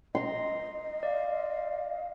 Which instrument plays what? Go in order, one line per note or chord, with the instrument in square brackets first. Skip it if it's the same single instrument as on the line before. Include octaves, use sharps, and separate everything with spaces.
[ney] D#5 [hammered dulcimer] A#5 C6
[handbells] D5 [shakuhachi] F5